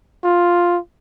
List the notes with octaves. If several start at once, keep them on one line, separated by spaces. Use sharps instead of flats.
F4